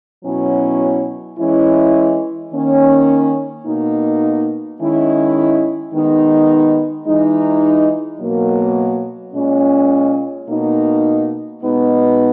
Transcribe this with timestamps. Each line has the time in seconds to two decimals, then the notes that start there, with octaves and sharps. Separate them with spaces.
0.25 B2 F#3 C#4 E4
1.38 E3 G#3 C#4 E4
2.52 D#3 A#3 C#4
3.66 B2 A#3 D#4
4.80 D#3 G#3 C#4 E4
5.93 D#3 G#3 B3 D#4
7.07 E3 G#3 D#4
8.20 B2 F#3 A#3
9.34 A#2 G#3 C#4
10.48 B2 A#3 D#4
11.62 B2 G#3 B3 D#4